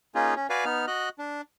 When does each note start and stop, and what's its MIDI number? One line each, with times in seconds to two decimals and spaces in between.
0.15 0.34 58
0.15 0.34 61
0.15 0.34 63
0.15 0.34 65
0.15 0.34 68
0.36 0.47 61
0.50 0.65 66
0.50 0.65 71
0.50 0.65 74
0.50 0.65 77
0.50 0.65 80
0.65 0.86 59
0.65 0.86 63
0.65 0.86 89
0.87 1.09 66
0.87 1.09 75
0.87 1.09 90
1.19 1.41 62